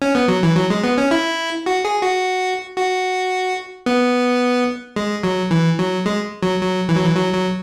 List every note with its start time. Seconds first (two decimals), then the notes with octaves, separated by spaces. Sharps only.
0.02 C#4
0.15 B3
0.28 F#3
0.43 E3
0.56 F#3
0.70 G#3
0.84 B3
0.98 C#4
1.11 E4
1.66 F#4
1.85 G#4
2.02 F#4
2.76 F#4
3.86 B3
4.96 G#3
5.23 F#3
5.51 E3
5.79 F#3
6.06 G#3
6.43 F#3
6.61 F#3
6.89 E3
6.97 F#3
7.04 E3
7.16 F#3
7.34 F#3